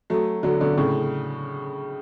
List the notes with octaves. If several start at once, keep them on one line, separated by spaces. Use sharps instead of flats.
F#3 A3
D3 F#3
B2 D3
A2 C#3